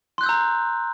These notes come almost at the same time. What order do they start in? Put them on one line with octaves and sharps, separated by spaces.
C6 F#6 G6 E6 A#5